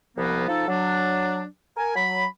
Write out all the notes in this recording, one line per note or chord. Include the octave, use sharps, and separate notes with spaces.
C2 F3 A#3 B3
F3 D#4 A4
F#3 D4
A#4 G#5
F#3 B5